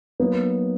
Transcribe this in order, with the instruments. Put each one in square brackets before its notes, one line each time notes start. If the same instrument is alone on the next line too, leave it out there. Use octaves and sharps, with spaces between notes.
[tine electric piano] F#3 A#3 D#4 [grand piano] B3